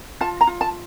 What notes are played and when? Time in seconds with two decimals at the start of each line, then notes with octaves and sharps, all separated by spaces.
0.21 F4 A5
0.41 A#5
0.47 F4
0.61 A5